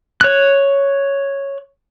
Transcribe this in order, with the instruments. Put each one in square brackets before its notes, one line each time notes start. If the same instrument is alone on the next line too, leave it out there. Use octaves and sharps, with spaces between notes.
[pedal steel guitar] C#5 F#6